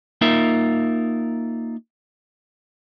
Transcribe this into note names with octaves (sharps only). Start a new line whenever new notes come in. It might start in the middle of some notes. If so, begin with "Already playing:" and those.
A#3 D#4 F4 A#4 E5